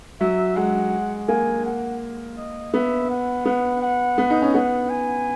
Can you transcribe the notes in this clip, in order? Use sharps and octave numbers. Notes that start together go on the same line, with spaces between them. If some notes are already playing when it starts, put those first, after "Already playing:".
F#3 E5
G#3 F#5
A#3 G#5
F#5
D#5
B3 E5
F#5
B3 F#5
F#5
B3
D#4
C#4
B3 F#5
G#5